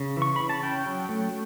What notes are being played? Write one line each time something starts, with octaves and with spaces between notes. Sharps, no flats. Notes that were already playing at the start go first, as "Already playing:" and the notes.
Already playing: C#3
E3
C#6
C#3 B5
A5
C#4 G5
F#3
A3